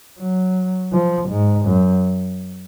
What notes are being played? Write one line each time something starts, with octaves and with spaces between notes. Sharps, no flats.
F#3
F3
G#2
F#2